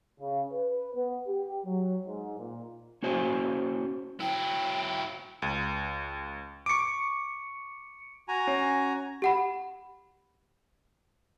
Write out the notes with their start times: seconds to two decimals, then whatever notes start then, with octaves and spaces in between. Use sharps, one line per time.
0.20 C#3
0.52 B4
0.94 B3
1.28 G4
1.66 F#3
2.06 G#2
2.39 A#2
3.03 A#3 C#4 F#4 C5 D#5 G#5
4.20 F#3 E4 G5
5.42 C#2
6.66 C#6 D6 C#7 D7
8.28 F#4 G#5 A#5
8.48 C#4
9.22 G4 F#5 B5